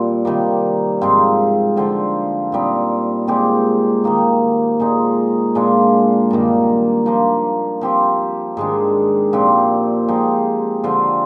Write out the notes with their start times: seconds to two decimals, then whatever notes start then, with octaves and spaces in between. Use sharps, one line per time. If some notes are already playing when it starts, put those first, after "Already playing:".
Already playing: A#2 G3 C4
0.25 C3 D#3 G3 A#3
1.01 G#2 F3 C4 F4
1.76 D3 F3 C4 F4
2.52 A#2 G3 C4 D#4
3.27 A#2 G#3 C4 G4
4.04 D#3 A#3 D#4
4.80 A#2 G#3 D#4
5.55 A#2 G#3 D4 F4
6.30 G2 D#3 A#3
7.06 F3 A#3 D4
7.81 F3 C4 G4
8.57 G#2 D#3 G#3 D4
9.33 A#2 F3 C4 G4
10.08 F3 G#3 D#4 G4
10.84 D3 F3 C4 F4